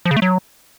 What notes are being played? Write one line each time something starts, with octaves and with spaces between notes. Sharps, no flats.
F3
C#3
A3
F#3